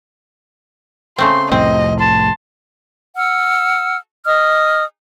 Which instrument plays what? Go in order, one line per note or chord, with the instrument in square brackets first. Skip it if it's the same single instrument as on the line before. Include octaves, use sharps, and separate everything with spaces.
[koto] C#3 A3 C4 [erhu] C6
[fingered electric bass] C2 F2 A2 [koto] C4 [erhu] D#5
[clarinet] A5 [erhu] C6
[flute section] F#5 E6 F6
D#5 D#6 F6